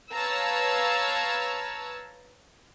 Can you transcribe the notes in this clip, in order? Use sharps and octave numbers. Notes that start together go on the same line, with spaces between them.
B4 C#5 F5 A5 A#5 E6